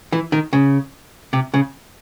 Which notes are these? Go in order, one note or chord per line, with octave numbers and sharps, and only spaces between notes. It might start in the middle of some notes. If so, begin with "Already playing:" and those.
E3
D#3
C#3
C3
C#3